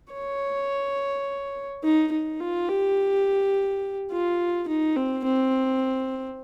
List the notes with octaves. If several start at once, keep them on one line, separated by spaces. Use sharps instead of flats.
C#5
D#4
D#4
F4
G4
F4
D#4
C4
C4